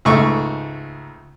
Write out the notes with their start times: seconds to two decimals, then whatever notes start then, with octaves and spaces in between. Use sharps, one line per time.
0.05 C#2 G#2 A3 C#6